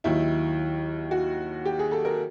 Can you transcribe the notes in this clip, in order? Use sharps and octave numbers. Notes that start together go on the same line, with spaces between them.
D#2 D#3 F#3 E4
F#4
G4
G#4
A4
A#4